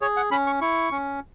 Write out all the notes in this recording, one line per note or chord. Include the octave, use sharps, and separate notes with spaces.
G#4 C#5
F#5
C#4 B5
C#6
E4 C#6
C#4